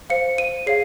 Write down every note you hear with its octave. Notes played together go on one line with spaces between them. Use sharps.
C5 F5 C#7
D#7
G#4 C#5 F5 C7